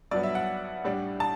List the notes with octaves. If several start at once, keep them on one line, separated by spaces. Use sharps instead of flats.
G2 F#3 B3 D5
E5
F#5
A2 G3 D4
A5